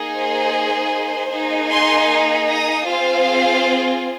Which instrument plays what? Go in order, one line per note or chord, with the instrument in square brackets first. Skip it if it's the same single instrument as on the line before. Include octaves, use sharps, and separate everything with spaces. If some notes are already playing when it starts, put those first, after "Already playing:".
Already playing: [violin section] A#3 D#4 G#4
C5
C5
A#3 D#4 G#4
G#5 C6
A#5 D#6
C4 F4 G#4 C5 F5